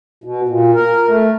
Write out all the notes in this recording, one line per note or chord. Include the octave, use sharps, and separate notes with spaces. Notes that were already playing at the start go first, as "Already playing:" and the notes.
B2
A#2
A#4
A3